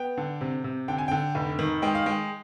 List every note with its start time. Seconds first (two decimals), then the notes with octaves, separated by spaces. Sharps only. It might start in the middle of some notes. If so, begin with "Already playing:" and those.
Already playing: B3 G5
0.17 D3
0.41 C3
0.64 C3
0.88 D3 G5
0.98 G#5
1.08 D3 G5
1.35 F1
1.59 D#3
1.82 G#3 G5
1.95 F5
2.06 G#3 G5